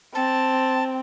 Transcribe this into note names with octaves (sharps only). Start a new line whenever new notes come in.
C4 A5